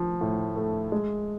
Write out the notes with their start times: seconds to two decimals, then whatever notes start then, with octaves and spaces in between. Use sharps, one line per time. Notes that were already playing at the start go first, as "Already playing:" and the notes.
Already playing: F3
0.21 A2
0.56 A3
0.92 G#3